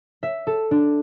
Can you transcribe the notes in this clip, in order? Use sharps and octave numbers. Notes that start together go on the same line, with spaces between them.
E5
A4
D4